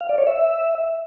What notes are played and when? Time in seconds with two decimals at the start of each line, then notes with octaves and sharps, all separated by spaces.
0.01 F5
0.09 D5
0.18 C#5
0.27 E5